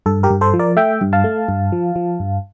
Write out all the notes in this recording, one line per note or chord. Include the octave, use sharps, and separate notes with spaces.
G2 A4
G4 A#4
G2
A4 C5
F3
A#4 D5
A3 E5 G5
G2
F5 A5
A3
G2
F3
F3
G2